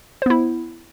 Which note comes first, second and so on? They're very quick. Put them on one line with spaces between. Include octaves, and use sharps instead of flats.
C5 B3 E4